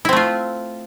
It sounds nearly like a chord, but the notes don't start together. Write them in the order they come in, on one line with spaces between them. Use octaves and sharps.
E4 C4 A3 F4